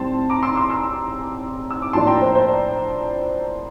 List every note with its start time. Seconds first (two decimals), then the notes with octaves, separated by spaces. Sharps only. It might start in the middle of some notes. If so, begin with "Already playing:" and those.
Already playing: A2 G3 C4 A5 C6
0.30 A#5 D6
0.43 C6 E6
0.56 C6 E6
0.70 C6 E6
1.71 E6
1.82 D6
1.93 A2 F3 A#3 D4 A5 C6
2.07 G5 A#5
2.22 C5
2.35 C5
2.48 D5